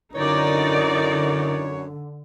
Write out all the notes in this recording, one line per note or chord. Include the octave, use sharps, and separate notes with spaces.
F#2 D3 D#4 E4 A#4 C#5 D5